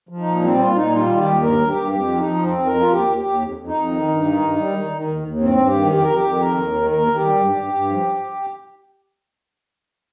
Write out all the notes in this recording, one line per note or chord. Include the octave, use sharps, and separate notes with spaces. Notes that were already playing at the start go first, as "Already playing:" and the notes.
F3
D#4
A#2
G3 C4
A#2 F4
A#2 D#4
G3 F4
D#3
G4
D#2
G2 A#4
G2
G4
G2
F2 G4
F3
D#4
F3
F2 C4
F2
A#4
F3
F4
D#2 G4
D#2
G4
D#2
F2
F2
D#4
F2
D#3
G2
D#3
G2
G3
D#3
D#3
D#2
D#2
G2 C4
G2
G4
D#3
F2 G4
F2 A#4
G4
F2
D#3 A#4
D#2
D#3
D#2 A#4
D#3
G4
G3
G2
G2
G2
F3